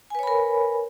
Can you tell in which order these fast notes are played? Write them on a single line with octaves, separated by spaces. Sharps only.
G#5 B4 C#5 B5 A#4